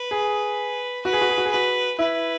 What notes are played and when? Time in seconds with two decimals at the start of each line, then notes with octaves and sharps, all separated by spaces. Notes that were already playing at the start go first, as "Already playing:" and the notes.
Already playing: B4
0.11 G#4
1.05 F#4 B4
1.13 G#4
1.21 F#4
1.29 G#4
1.38 F#4
1.45 G#4
1.51 F#4 B4
1.99 E4 B4